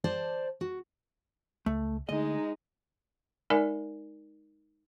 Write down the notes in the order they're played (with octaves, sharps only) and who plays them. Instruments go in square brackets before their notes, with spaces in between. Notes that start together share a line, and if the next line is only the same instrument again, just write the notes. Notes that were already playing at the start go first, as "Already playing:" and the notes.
[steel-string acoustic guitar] C5 D5 A5
F#4
[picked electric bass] C#2 [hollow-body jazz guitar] A3
[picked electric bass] D3 A3 [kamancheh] G#3 D#4 [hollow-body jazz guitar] D#5
[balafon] G#3 D#4 A#4 D5 G#5